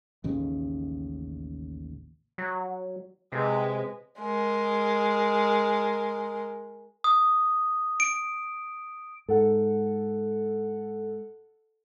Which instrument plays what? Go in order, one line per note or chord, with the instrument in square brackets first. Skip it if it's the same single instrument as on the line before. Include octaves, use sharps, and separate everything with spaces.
[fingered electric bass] A1 D#2 C#3
[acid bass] F#3
[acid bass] C3 [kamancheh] G#3 B4
[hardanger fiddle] G#3 A#4
[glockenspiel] D#6
D7
[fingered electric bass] G#2 [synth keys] A4 F#5